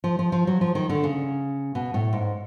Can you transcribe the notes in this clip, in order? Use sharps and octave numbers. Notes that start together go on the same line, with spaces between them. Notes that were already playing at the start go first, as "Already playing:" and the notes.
F3
F3
F3
F#3
F3
D#3
D3
C#3
B2
A2
G#2